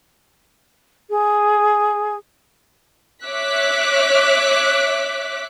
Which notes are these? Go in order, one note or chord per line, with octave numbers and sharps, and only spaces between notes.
G#4
C#5 E5 D6 F#6 B6